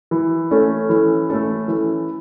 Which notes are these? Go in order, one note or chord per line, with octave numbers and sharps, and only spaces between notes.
E3
A3 C#4 A4
E3
A3 C#4 A4
E3